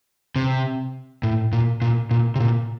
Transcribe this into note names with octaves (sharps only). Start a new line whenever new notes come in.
C3
A2
A#2
A#2
A#2
C3
A#2